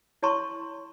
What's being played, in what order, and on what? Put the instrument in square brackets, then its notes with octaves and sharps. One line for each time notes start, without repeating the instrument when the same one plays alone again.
[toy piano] E4 C#5 A5 A#5 C6 C#6